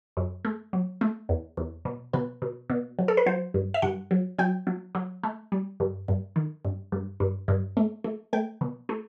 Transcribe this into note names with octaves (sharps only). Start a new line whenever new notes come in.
F#2
A3
F#3
A3
E2
E2
B2
B2 B4
B2
B2
F#3
A4
B4
F#3 C5
G2
E5
G2 F#5
F#3
F#3 G5
F#3
F#3
A3
G3
G2
G2
D#3
G2
G2
G2
G2
A3
A3
A3 G5
B2
A3